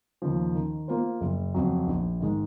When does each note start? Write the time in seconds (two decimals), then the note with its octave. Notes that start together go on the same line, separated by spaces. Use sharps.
0.22 D#2 C#3 F3
0.55 D#3
0.88 A#3 F4 C5
1.21 F#1
1.54 F2 C#3 F#3
1.88 A#1
2.21 G#2 D#3 G#3